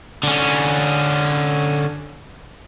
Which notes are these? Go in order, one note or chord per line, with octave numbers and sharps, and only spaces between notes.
D3 C#4